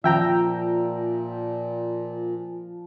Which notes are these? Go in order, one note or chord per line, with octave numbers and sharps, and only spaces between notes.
A#2 F3 E5 G5 A#5